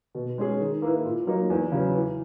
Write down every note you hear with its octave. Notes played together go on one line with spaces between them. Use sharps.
B2
G#3 C#4 G#4
D#3
A#3 E4 B4
A#2
F#3 A#3 D#4
E2
C#3 F#3 B3
E3